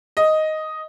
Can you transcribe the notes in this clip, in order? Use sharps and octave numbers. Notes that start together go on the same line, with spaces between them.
D#5